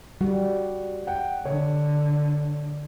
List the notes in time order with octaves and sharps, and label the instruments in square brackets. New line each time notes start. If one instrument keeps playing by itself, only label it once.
[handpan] G3 [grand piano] F#4
[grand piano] F#5 G5
[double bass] D3 [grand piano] C#5